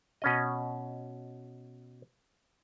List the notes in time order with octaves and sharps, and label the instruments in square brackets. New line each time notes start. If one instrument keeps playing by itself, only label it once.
[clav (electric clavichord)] B2 C#4 D#5